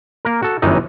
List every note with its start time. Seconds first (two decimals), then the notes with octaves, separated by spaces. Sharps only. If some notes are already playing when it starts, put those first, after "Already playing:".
0.25 A#3 A#4
0.42 F#4 A4
0.62 G1 F#2 D#3 E3 D#4 D#5